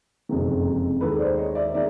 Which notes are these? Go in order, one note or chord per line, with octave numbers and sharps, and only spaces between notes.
F#1 F2 C3 D#3 G#3
D#2 D#3 G#3 A4 B4
C5 D5
C#5 D#5
D5 E5
D#3 G#3 D5 E5